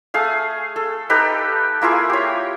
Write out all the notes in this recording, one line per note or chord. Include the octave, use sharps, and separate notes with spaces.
A3 G#4 F5
A4
D#4 G4 A4 B4
A#3 E4 F4 G#4
G4 C#5